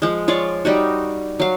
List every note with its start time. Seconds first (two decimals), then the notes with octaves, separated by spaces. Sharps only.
0.02 F3 G#3
0.28 F4 C#5 D5 F5
0.65 G3 D#4 F#4
1.40 F#3 F5